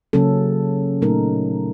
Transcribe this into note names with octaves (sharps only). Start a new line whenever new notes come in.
C#3 F#3 A#3 C#4 A4
A#2 F#3 A3 D#4 A#4